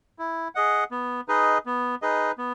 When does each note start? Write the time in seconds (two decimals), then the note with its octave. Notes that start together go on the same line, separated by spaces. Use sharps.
0.19 E4
0.55 G#4 D#5 F#5
0.91 B3
1.28 D#4 G#4 B4 D#5
1.66 B3
2.02 D#4 G#4 B4 D#5
2.38 B3